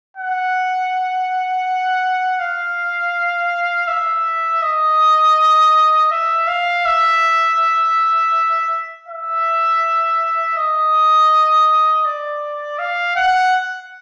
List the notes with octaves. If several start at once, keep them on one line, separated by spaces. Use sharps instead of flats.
F#5
F5
E5
D#5
E5
F5
E5
E5
D#5
D5
F5
F#5